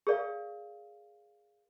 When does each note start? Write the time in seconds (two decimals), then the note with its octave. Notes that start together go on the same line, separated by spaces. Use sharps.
0.07 G#4 A#4 D5 F5